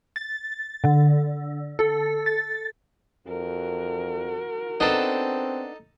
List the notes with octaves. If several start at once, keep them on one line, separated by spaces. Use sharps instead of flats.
A6
D3
A4
A6
F2 F#4 A#4
B3 C4 D4 D#4 A4